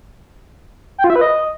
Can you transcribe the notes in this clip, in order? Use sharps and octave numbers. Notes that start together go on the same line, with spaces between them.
G5
F4
E5
B4
D#5